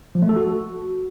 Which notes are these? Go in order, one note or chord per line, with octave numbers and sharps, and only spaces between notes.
F3
A3
A4
F#4